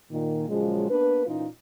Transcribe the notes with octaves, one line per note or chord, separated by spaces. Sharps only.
A#2 D#3
A#2 C#3 F3 F#3 G#3
A#3 B3 D4 B4
A#2 E3 C#4 D#4 F4